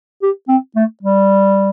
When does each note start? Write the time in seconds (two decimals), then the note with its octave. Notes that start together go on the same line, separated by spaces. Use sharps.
0.22 G4
0.48 C4
0.76 A3
1.03 G3